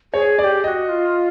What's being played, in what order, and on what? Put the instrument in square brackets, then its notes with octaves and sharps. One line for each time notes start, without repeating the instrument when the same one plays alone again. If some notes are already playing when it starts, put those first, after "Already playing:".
[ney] G#4 [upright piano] C#5
[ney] G#4 [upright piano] D5
[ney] G4
[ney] G4 [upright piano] D#5
[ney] F#4
F4